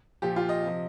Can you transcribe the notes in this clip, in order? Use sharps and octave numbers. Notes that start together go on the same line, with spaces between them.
A#2 F3 G4
F4
D#5
C3 F3